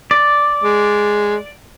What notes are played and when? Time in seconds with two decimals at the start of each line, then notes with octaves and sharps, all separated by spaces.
0.11 D5
0.64 G#3